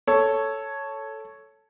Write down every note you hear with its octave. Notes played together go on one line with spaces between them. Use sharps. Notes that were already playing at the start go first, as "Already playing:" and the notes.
A4 C#5